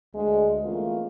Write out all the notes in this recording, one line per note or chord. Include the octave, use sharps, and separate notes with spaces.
D2 G#3
E3 A3 A#3 C4 C#4 F4